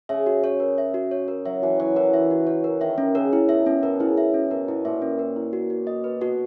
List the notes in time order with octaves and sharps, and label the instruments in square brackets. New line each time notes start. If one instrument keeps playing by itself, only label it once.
[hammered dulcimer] C#3 [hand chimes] E5
[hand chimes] F#4
C#5
A#4
E5
F#4
C#5
A#4
[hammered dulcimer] F#3 [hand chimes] E5
[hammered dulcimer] E3 [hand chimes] F#4
[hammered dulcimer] F#3 [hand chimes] C#5
[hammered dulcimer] E3 [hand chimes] A#4
[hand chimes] E5
F#4
C#5
A#4
[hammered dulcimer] D#3 [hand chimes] E5
[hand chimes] C#4
[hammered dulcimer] C#3 [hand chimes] A#4
[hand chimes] E4
[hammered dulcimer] B2 [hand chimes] E5
[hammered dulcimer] B2 [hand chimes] C#4
[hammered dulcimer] B2 [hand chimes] A#4
[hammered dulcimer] C#3 [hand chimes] E4
[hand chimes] E5
C#4
[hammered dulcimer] B2 [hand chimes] A#4
[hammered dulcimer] B2 [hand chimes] E4
[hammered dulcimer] A#2 [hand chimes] E5
[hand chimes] C#4
A#4
E4
F#4
F#4
D#5
B4
[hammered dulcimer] B2 [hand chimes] F#4